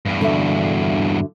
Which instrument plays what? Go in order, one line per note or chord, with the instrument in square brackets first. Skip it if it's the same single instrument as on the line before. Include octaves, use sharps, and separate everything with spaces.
[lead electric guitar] E2 G2
[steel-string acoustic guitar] D3 F#4 E5